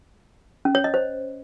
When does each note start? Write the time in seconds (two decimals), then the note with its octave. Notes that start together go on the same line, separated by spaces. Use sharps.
0.65 C#4
0.75 C#5
0.84 D#5
0.94 C5